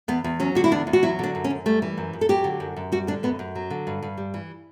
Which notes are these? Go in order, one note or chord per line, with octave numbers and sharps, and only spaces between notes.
E2 B3
E2
F#3 C#4
D3 F#4
E4
E2 D4
E2
F#4
F#3 E4
D3 D4
F#2
C#4
F#2
G3 A3
E3
F#2
F#2
A4
F#3 G4
D3
F#2
F#2
G3 F#4
D3 D4
F#2 B3
F#2
F#3
D3
G2
G2
G3
E3